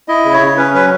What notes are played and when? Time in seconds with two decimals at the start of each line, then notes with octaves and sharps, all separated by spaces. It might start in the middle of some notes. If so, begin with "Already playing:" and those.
0.08 E4 D#5
0.25 C#3
0.33 C#5
0.41 C#3
0.57 C#4 B4
0.74 F#3 B4